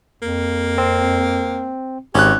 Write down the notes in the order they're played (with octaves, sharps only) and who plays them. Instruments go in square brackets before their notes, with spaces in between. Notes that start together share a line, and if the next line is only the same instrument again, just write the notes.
[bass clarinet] F2 [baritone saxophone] A#3
[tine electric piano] C4
[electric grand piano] G#1 F#6 [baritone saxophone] C#4 [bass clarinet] G4